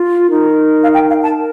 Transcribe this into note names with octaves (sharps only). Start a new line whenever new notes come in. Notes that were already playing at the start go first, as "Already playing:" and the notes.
Already playing: F4
D#4 A#4
F5
G5
F5
A5
A#4